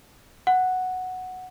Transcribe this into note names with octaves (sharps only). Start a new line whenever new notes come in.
F#5